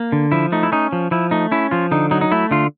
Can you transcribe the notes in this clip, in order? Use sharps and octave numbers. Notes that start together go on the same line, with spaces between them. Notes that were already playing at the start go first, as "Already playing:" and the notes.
Already playing: A#3
D3
F3 E4
A3 D#4
E4
C#4 D#4
F3
F3 E4
A3 D#4
C#4 E4
F3 F4
D3 D#4
F#3 D#4
D#4
A3 E4
D3 F4